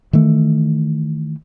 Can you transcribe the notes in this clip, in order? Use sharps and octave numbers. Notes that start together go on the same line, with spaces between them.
D#3 E3 A3